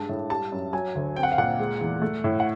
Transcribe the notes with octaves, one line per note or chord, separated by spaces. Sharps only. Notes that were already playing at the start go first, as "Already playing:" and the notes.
Already playing: G2 G#3 A5
A2
G3 A5
F#2
F#3 G#5
D2
C4 G5
F#5
F5
A#2 F#5
G#3
E2
A3
A2
F#5